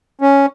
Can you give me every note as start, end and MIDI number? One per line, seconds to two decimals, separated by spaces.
0.21 0.46 61